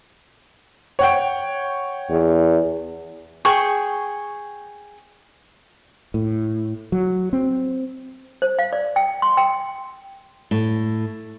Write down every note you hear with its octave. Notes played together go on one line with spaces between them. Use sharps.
C#5 F#5 G5
E2
G#4 G5 C#6
A2
F#3
C4
C5
F5
D5
G5
C6
G5
A2